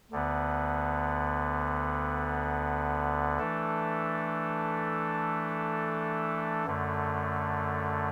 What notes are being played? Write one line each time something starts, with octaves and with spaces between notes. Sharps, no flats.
D2 D3 B3
E3 A3 D4 A4
F#2 D3 A3